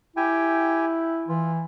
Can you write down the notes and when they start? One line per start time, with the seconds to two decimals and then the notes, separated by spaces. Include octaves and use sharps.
0.17 E4 G4 G5 G#5
1.28 E3 F4